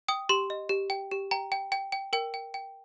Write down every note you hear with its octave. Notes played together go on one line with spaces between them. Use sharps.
G5 D#6
G4 C6
D#5
G4
G5
G4
G5 A#5
G5
G5
G5
A#4 G5
G5
G5